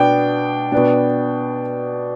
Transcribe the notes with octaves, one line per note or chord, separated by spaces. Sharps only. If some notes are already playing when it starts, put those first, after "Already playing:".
Already playing: B2 B3 D4 G5
B2 B3 D4